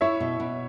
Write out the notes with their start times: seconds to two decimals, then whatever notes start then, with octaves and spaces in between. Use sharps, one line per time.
0.01 E4 C#5 E5
0.20 B2
0.40 B2